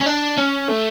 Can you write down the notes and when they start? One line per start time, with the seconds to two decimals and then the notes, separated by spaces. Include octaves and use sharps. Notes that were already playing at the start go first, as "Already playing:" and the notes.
0.01 C#4
0.06 D4
0.38 C#4
0.68 A3